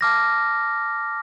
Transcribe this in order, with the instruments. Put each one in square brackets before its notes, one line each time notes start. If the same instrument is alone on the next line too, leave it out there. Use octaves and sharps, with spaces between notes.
[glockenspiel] A5 D6 F6 A#6